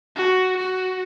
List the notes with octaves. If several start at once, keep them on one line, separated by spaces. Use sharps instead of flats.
F#4
F#4